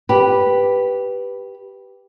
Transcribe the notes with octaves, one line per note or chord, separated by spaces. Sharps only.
G4 B4